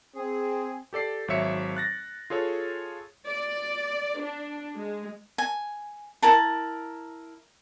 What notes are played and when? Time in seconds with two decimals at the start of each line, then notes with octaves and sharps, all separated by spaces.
0.15 C4 G#4
0.93 G4 A4 D5 C7
1.28 G#1 F#3 C#5 E5 C#7
1.77 F#6 A6 A#6
2.30 F4 G#4 A4 C#5
3.27 D5
4.20 D4
4.78 G#3
5.38 G#5
6.23 E4 A#4 A5